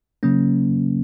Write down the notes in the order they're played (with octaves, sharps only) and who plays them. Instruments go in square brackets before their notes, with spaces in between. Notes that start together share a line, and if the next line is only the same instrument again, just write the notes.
[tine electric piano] C#3 F#3 A#3 C#4